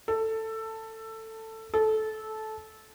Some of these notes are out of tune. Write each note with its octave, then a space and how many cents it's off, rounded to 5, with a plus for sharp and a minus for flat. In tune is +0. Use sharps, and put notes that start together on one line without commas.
A4 +15
A4 -15